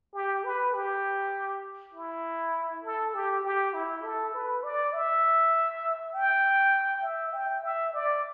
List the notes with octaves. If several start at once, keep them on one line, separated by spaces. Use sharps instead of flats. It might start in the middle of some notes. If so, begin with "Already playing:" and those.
G4
B4
G4
E4
A4
G4
G4
E4
A4
B4
D5
E5
G5
E5
G5
E5
D5